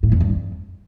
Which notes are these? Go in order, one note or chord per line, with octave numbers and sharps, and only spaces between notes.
A2
F2
G2
F2